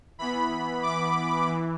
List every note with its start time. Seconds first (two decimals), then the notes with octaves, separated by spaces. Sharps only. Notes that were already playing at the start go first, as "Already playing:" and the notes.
0.19 E3 B3 B5
0.83 D6
1.47 E3